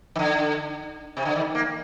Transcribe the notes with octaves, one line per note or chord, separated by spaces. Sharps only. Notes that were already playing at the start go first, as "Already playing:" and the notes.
D#3
D3
C3
D3
D#3
A#3